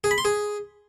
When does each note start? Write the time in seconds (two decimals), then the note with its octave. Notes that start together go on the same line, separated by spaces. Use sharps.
0.04 G#4
0.11 B5
0.18 C6
0.25 G#4